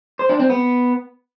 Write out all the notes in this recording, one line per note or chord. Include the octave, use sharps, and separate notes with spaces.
C5
D4
C4
B3